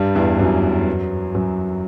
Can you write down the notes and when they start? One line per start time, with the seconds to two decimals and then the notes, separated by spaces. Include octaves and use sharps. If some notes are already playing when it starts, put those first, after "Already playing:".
Already playing: G2 G3
0.15 E2 E3
0.39 F#2 F#3
1.35 F#2 F#3